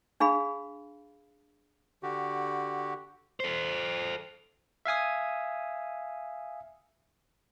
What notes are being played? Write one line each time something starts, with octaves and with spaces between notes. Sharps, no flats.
D4 G#4 F5 B5
D3 F#4 G4
A4 C5
E5 F5 G#5 D#6